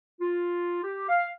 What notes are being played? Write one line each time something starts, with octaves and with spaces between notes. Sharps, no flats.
F4
G4
F5